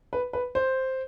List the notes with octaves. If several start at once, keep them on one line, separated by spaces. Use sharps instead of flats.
B4
B4
C5